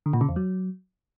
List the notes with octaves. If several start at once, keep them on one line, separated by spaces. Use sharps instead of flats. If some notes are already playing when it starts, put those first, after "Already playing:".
D3
A#2
C#3
E2
F#3